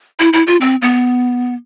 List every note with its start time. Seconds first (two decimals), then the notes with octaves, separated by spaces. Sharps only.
0.20 E4
0.33 E4
0.47 F4
0.61 C4
0.82 B3